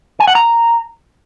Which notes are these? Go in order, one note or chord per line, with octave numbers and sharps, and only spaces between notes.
G#5
F#5
A#5